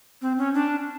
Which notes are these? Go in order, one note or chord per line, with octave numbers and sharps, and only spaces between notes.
C4
C#4
D4